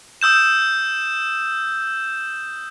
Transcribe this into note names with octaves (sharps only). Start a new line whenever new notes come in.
D#6 E6 G6 E7